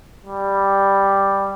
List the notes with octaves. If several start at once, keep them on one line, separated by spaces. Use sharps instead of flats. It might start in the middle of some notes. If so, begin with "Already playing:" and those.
G3